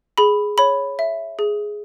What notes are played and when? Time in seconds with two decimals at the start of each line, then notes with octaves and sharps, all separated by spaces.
0.18 G#4 B5
0.58 C#5 B5
0.99 E5
1.39 G#4